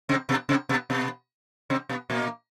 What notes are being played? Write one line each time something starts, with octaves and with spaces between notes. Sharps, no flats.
C3 C4
B2 B3
C3 C4
B2 B3
B2 B3
C3 C4
B2 B3
A#2 A#3